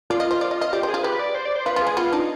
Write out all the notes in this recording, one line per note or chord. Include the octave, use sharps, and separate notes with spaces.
F4 D5
D#5
C5
D5
D#5
D#5
G4 D5
G#4 C5
F4
G4 B4
D5
C5
D5
C5
F4 B4
F4
G#3 G#4
B3 F4
D4 D#4